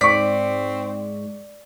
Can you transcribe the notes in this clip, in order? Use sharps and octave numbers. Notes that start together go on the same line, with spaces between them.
G#2 C4 D5 C#6 B6